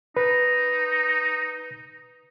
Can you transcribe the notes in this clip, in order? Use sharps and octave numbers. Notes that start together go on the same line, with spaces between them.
D#4 B4